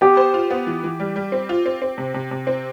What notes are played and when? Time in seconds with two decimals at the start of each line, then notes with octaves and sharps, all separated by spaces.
0.01 B3 G4
0.17 C5
0.34 F4
0.50 B3
0.67 E3
0.84 E3
1.00 G3
1.16 G3
1.32 C4
1.49 F4
1.66 C4
1.82 C4
1.98 C3
2.14 C3
2.31 C3
2.47 C4